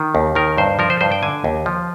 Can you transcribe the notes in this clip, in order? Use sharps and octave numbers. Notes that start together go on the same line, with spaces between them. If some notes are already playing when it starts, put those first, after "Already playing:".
Already playing: D#3
D#2
D#3 A#4
G2 C5
F3 A#4
C5
G2 C5
G5
D3 G#5
D#2
F3